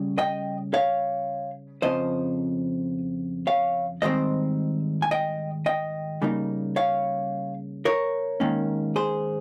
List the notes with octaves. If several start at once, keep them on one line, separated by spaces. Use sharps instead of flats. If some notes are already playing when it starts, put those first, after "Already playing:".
Already playing: C#3 G3 C#4
D#5 G5
C#5 F5
F2 C#3 F3 C5 D#5
C#5 F5
G#2 D#3 G3 C4 C5 D#5
G#5
D#5 G5
D#5 G5
C#3 G3 A#3 D#4
C#5 F5
A#4 C#5
G#2 D#3 A#3 C#4
G#4 C5